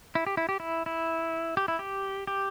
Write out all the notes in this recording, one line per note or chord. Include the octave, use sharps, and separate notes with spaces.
E4
G4
E4
G4
E4
E4
G4
E4
G4
G4